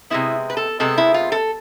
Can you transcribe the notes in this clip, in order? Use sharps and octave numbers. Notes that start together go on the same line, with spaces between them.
C3 G#3 B3 E4
B4
A4
C3 G#3 B3 A4
E4
F4
A4